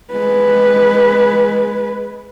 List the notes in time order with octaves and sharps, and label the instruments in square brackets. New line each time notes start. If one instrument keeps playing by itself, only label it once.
[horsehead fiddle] G#3 B4